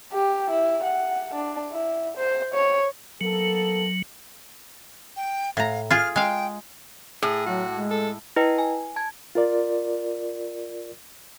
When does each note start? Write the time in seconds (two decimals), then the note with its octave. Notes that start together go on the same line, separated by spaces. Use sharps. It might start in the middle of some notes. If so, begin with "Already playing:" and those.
0.13 G4
0.50 E4
0.84 F#5
1.34 D4
1.72 E4
2.17 C5
2.54 C#5
3.21 F#3 A#3 B3 A4
5.16 G5
5.57 A2 F5 A#5
5.90 F4 G#4 F6
6.16 G#3 F5 G5
7.22 A2 G#4
7.46 F#3 F#4
7.71 G#3
7.91 A4
8.36 E4 B4 D#5 G5 A#5
8.59 G#5
8.96 A5 G#6
9.35 F4 A#4 D5